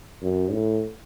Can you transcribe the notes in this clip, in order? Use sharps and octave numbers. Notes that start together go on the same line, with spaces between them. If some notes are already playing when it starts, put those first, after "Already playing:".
F#2
A2